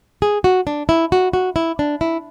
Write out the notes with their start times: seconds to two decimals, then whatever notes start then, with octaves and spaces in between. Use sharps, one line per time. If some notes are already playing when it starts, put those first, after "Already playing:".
0.22 G#4
0.44 F#4
0.67 D4
0.89 E4
1.12 F#4
1.33 F#4
1.56 E4
1.79 D4
2.01 E4